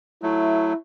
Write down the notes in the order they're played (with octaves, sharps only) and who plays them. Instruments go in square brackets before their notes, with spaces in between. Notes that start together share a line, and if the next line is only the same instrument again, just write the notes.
[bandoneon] F#3 A3 [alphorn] E4